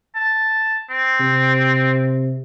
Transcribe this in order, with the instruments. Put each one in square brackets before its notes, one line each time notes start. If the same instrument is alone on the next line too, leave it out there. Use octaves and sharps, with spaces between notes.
[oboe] A5
C4
[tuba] C3